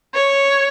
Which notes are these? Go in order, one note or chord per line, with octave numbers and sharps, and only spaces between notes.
C#5